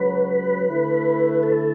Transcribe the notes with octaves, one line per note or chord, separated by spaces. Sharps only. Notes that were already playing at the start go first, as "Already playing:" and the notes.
Already playing: C#2 C#3 F#3 B4
D3 A3 E4
A4